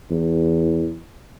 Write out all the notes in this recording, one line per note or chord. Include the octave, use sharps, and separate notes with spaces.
E2